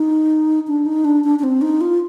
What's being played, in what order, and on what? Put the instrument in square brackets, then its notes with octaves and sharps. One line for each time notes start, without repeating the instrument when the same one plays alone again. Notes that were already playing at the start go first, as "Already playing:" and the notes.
Already playing: [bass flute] D#4
D4
D#4
D4
D4
D4
C4
D#4
F4